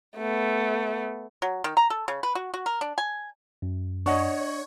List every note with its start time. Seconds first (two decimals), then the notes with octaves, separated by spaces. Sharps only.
0.17 A3 B3
1.42 F#3
1.64 D#3
1.77 A#5
1.90 A4
2.08 C#3
2.23 B4
2.35 F#4
2.54 F#4
2.66 A#4
2.81 D4
2.98 G#5
3.62 F#2
4.06 D4 C#5 D#5 F#5 C#6